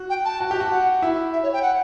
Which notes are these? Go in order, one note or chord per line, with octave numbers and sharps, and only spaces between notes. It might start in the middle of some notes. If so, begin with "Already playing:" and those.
Already playing: F#4
G5
A5
F#4
G4
F#4
F#5
E4
E5
C#5
G5
F#5